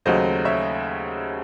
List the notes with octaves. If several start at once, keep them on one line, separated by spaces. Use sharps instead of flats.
D#2 C#3 F#3 A3 C5 D#5
C#5 E5